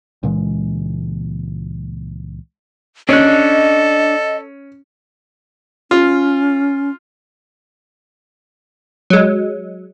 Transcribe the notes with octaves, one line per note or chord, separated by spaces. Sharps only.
C#2 A#2 E3 G#3
C#4 D4 A4 D#5 F#6
C#4 F4
F#3 G#3